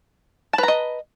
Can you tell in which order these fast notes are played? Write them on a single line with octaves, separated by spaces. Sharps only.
A5 B4 A#5 D#5